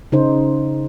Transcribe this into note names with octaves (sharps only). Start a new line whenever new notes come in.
C#3 D#4 C5